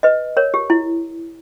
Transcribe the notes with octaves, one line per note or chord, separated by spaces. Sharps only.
B4 D#5
A#4 C#5
G4
E4